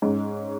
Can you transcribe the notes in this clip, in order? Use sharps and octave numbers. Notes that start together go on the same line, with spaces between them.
G#2 G#3 C#4